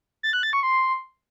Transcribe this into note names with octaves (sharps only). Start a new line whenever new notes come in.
A6
F#6
A6
C#6
C6